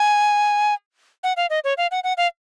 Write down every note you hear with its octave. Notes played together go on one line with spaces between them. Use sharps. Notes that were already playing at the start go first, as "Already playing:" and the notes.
Already playing: G#5
F#5
F5
D#5
C#5
F5
F#5
F#5
F5